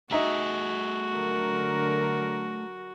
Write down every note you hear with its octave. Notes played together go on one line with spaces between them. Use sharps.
A3 D#4 F#4 G#4 E5 A#5
D3 F#3 A#4